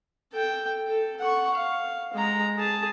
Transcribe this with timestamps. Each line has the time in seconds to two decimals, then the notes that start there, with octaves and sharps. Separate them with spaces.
0.33 A4 G5
0.88 A4
1.20 F#5 C#6
1.55 F5
2.14 G#3 A#5
2.58 G#4 A5